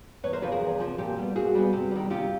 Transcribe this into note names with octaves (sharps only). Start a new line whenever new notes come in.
E2 B4 C#5
A#4 C5
C3 F3 A4 B4
G#4 A#4
E2
C3 F3
A#2 G4 A4
G3 B3
A#2 F#4 G#4
G3 B3
C3
D#3 G3
C3 F4 G4